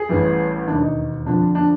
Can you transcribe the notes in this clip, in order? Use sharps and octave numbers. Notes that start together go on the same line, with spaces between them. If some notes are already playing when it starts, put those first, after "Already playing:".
Already playing: G#4
A1 A2 E3 G3
E1 D#2 D#3 D4
D#4
F2 D3 F3 D4
D4